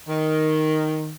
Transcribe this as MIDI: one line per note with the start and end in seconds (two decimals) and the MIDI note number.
0.08 1.14 51